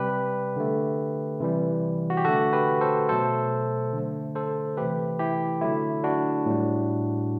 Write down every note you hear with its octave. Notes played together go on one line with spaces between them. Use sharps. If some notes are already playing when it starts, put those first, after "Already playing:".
Already playing: C3 G3 G4 B4
D3 A3
C3 E3 G3
F#4
G4
D3 A3 F#4 A4
G4 B4
A4 C5
B2 F#3 A3 A4 C5
D3 A3
A4 C5
C3 E3 A3 G4 B4
E4 G4
D3 F#3 A3 E4
D4 F#4
A2 G3